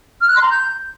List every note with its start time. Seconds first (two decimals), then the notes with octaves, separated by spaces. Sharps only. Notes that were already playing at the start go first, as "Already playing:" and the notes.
0.21 F6
0.28 F#6
0.35 C6
0.43 A#5
0.50 G6